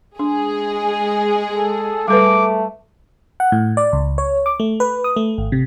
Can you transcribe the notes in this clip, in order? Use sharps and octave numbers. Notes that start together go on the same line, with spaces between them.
G#3 D4 G#4
A4
G3 A3 A4 B4 D6
F#5
A2
D5
C#2
C#5
D6
A3
B4
D#6
A3
G#1
C3